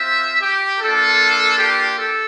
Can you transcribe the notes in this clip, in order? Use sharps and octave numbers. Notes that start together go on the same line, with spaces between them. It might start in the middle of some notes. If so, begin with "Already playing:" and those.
Already playing: C4 F4 E5
G4
A#3 D4 F4 A4
G4
A4